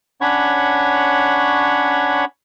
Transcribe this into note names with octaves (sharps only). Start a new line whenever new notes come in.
C#4 D4 C#5 F#5 B5 C#6